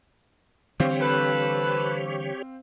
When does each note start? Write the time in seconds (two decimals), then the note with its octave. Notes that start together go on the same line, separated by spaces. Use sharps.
0.80 D3 E3 G3 C4 G4 C5 C#5 F5
1.01 A4 B4